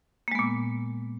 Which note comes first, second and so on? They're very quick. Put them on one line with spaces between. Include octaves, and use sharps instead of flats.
A#3 G#3 B3 A#2